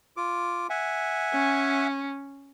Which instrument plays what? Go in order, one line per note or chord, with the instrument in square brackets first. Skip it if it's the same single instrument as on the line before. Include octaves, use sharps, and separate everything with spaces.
[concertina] F4 D6
E5 F#5 G#5
[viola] C#4